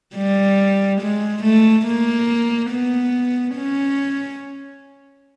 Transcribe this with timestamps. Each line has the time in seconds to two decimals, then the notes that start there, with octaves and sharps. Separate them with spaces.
0.16 G3
1.01 G#3
1.44 A3
1.86 A#3
2.71 B3
3.56 C#4